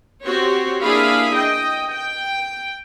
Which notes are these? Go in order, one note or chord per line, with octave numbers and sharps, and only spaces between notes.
C4 F#4 G4 C5 C#5
A#3 D4 E4 G#4 F5 B5
D#5 G5
G5